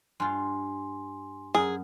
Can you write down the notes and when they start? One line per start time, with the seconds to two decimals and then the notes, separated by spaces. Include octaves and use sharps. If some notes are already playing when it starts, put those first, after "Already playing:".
0.20 G2 F4 G#5 C6
1.55 F#2 G#4